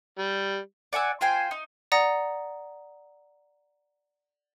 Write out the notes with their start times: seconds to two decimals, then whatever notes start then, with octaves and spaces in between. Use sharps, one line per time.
0.19 G3
0.93 D5 F#5 G#5 E6
1.21 F4 C5 G5 G#5
1.51 D#4
1.92 D5 F#5 A#5 D#6 A#6